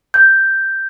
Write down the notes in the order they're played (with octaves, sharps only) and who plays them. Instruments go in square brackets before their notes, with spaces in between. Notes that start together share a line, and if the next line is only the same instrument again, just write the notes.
[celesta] G6